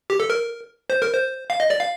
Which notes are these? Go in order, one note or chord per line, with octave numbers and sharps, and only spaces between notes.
G4
A4
A#4
C5
A#4
C5
F5
D#5
D5
F5